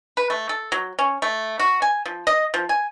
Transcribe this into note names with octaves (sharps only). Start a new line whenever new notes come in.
B4
A3
A4
F#3
C#4
A3
F#4
G#5
F3
D#5
F3
G#5